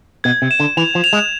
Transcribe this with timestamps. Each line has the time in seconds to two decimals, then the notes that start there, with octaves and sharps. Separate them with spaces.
0.24 B2 G#6
0.42 C3
0.51 E7
0.60 D3
0.77 E3 F7
0.95 F3
1.04 F7
1.13 G#3